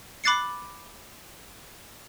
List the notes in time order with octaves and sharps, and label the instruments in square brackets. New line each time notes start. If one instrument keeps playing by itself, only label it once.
[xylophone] B5 D6 F#6 A6 C7 C#7